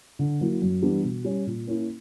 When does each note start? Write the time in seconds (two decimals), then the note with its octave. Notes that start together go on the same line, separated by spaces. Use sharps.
0.19 D3
0.41 F#3 A#3 E4
0.62 F#2
0.83 E3 G3 B3 D4
1.04 B2
1.25 G3 C#4
1.47 A#2
1.67 A#3 C#4 E4